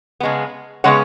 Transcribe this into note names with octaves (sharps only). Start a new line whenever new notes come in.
C#3 G#3 B3
C#3 G#3 B3 C#5 F#5